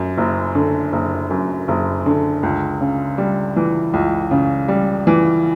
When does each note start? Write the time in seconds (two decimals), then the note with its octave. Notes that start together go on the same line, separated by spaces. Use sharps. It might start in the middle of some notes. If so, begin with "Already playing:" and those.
Already playing: F#2
0.17 F#1
0.55 D3
0.92 F#1
1.30 F#2
1.68 F#1
2.06 D3
2.43 C#2
2.81 C#3
3.18 G3
3.57 E3
3.93 C#2
4.31 C#3
4.68 G3
5.07 E3